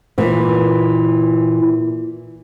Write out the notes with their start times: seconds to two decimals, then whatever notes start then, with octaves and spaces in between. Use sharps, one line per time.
0.18 A#2 E3